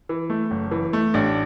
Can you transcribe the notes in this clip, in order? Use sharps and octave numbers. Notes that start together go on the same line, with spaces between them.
E3
A3
F#1
E3
A3
A1 D4